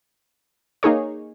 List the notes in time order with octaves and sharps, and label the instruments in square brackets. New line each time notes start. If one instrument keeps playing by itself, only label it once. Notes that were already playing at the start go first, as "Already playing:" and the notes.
[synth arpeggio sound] A#3 D#4 G#4 C#5